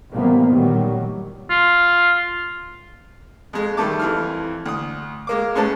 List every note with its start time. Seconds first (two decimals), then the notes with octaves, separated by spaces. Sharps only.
0.12 A1 C3 F3 G3 A#3 B3
0.51 A#2 D#3 F#3 G3
1.50 F4
3.53 F2 G#3
3.77 D#3 G3 A3 A5 D6
3.99 F2 E3 F6
4.66 D2 D#6
5.27 G#3 A#3 D6
5.56 A2 G#3 C#4 B4 A5